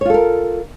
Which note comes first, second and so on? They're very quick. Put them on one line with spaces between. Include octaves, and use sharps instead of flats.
C#5 F4 A4 A#4